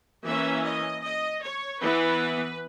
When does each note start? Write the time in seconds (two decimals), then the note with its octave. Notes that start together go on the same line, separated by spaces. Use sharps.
0.25 E3 A#3 C#4 E5
0.65 D#5
1.03 D#5
1.43 C#5
1.83 E3 B3 B4